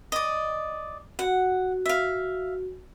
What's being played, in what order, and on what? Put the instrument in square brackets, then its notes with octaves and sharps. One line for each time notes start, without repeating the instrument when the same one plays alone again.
[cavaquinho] D5 D#5
[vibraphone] F#4 [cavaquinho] F#5
[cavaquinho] E5 F5